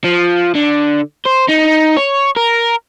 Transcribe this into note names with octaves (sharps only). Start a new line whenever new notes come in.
F3
D3
C5
D#4
C#5
A#4